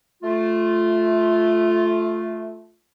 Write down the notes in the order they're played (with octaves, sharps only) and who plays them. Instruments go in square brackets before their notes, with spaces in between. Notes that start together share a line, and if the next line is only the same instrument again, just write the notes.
[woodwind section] A3 F4